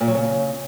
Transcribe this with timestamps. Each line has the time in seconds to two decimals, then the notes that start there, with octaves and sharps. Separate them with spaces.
0.01 A#2
0.08 F#3
0.15 C#3